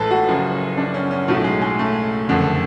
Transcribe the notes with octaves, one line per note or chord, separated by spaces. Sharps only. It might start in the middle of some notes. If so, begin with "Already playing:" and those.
Already playing: A1 A2 G#3 A4 B4
F#4
F#1 F#2 F3
D4
C#4
C#4
B1 A2 F#3 A3
G#3
G#3
A3
F#1 F2 D3